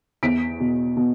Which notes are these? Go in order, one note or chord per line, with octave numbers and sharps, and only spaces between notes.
E2 B6 D7
B2
B2